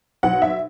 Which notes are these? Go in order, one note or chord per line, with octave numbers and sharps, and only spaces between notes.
B1 F#5
E5